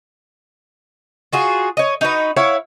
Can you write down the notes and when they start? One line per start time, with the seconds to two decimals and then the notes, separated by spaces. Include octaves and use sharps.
1.33 F4 F#4 G#4
1.77 C#5 D#5
2.01 D#4 F#4 B4
2.36 E4 C#5 F5 F#5